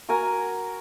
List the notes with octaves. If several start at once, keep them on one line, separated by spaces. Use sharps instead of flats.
F#4 A#4 G#5 A#5